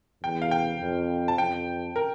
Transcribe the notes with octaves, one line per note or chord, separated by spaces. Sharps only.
E2 G5
F5
G5
F2
A5
F2 G5
A#4